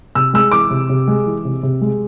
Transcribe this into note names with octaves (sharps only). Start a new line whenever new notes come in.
C3 E6
G#3 E6
E3 D6
C3
C3
G#3
E3
C3
C3
G#3